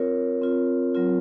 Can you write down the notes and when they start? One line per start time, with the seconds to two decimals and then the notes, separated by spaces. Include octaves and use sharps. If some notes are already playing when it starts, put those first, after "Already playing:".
Already playing: C4 F4 A#4 C#5
0.42 C4 F4
0.95 F#3 C4 F4